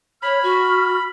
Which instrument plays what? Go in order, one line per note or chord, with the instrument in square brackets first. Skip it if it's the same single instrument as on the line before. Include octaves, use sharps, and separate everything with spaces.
[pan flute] C#5 [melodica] B5 [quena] F6
[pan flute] F#4